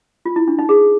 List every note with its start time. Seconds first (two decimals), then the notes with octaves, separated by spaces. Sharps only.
0.25 F4
0.36 E4
0.48 D4
0.59 D#4
0.69 G#4